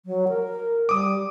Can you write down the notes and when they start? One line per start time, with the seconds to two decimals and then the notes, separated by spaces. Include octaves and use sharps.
0.06 F#3
0.29 A#4
0.89 G3 D6 D#6